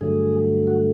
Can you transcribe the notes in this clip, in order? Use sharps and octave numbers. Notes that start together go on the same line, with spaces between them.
G2 D3 F#3 A3 G#4
F#4